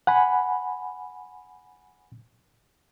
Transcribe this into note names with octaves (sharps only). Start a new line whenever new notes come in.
F#5 G#5 B5